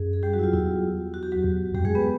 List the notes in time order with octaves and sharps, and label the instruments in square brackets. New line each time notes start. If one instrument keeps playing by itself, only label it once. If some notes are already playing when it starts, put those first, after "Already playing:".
Already playing: [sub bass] F#2 [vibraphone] G#4
[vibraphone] G#4
G3 G4
F#3 F#4
E4
F4
[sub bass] E2 [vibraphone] E4
[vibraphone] F#4
G4
F#3 F#4
[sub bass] E2
[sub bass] F2 [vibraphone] G3 G4
[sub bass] F#2 [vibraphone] G#3 G#4
[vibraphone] B3 B4